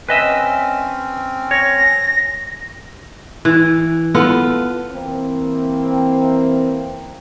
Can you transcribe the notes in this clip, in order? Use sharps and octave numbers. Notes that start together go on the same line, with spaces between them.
C4 C#4 B4 D#5 E5
C#5 A#6
E3
B3 F4 A4
E3 A#3 C4